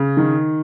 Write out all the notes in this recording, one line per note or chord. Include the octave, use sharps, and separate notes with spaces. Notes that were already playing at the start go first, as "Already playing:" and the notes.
Already playing: C#3
D#3